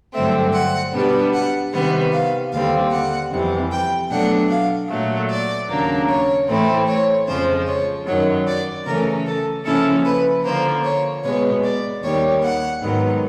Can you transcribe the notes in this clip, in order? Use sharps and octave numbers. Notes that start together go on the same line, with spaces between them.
G2 D3 F#3 A3 C4 E5
F#5
B2 G3 B3 D4
F#5
C3 D#3 G3 B3 F#5
F5
D#2 D3 G3 C4 F5
F#5
F2 C3 E3 G3
G5
B2 F#3 A3 D4 F#5
F5
A#2 F#3 A3
D5
D#2 C#3 F#3 A#3 D4
C#5
A2 E3 A3 C4 E4
C#5
F2 C#3 F3 G#3 C5
C#5
F#2 D#3 F#3 C#5
D5
C#3 E3 A3 C#4 A#4
A4
C#3 F3 A#3 C#4 E4 A4
B4
D3 F3 A#3 C5
C#5
B2 G#3 B3 C#5
D5
D#2 D#3 G3 C#5
F#5
G#2 D#3 F#3 B3